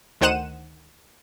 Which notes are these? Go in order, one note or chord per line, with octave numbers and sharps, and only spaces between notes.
D2 D#3 C5 F#5 D#7 E7